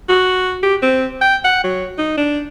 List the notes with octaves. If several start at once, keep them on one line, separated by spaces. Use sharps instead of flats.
F#4
G4
C4
G5
F#5
F#3
D#4
D4